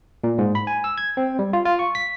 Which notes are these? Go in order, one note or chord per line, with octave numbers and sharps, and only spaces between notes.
A#2
G#2
B5
G#5
E6
G#6
C4
G3
F4
F4
C#6
B6